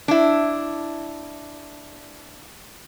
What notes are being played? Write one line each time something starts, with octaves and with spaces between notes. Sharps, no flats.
D4 E4